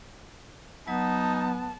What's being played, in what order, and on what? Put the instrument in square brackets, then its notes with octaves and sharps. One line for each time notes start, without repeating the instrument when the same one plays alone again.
[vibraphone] F#3 [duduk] B3 [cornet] D#4 [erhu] A5